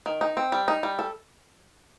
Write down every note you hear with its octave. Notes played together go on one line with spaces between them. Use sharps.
D#3
D#4
C4
G3
D#4
G3
A4